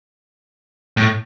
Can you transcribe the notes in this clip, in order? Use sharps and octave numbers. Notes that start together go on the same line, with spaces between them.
A2